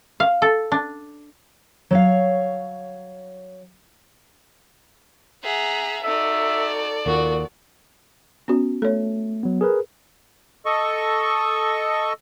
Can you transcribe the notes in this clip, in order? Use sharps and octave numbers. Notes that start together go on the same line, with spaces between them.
F5
A4
D4
F#3 C#5 F5
G#4 E5 F#5 A#5
D#4 F#4 A4 D5 E5
D#2 A#2 D#3 F#4
B3 C#4 F#4
A3 A4 C#5
F#3 B3
G#4 A#4 B4
A4 D#5 C#6